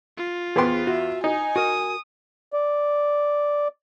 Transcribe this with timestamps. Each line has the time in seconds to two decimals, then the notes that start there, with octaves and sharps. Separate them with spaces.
0.17 F4
0.56 E2 B3 G#4 C5 G5 C6
0.87 F#4 E5
1.24 D#4 G#5
1.56 F#4 A#4 D#6
2.53 D5